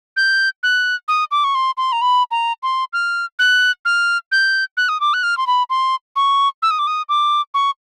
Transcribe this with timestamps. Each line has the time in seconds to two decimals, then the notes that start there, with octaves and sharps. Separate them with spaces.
0.17 G6
0.63 F#6
1.08 D#6
1.31 D6
1.44 C#6
1.55 C6
1.77 C6
1.92 A#5
2.01 B5
2.31 A#5
2.63 C6
2.93 F6
3.39 F#6
3.85 F6
4.32 G6
4.77 F#6
4.89 D#6
5.00 D6
5.14 F#6
5.23 F6
5.37 C6
5.47 B5
5.70 C6
6.16 C#6
6.62 E6
6.71 D#6
6.79 D6
6.87 D#6
7.09 D6
7.54 C#6